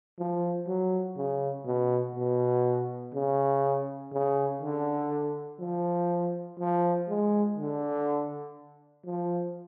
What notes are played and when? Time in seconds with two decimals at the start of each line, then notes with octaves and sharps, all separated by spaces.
0.19 F3
0.67 F#3
1.16 C#3
1.66 B2
2.15 B2
3.14 C#3
4.12 C#3
4.62 D3
5.60 F3
6.60 F3
7.09 G#3
7.58 D3
9.06 F3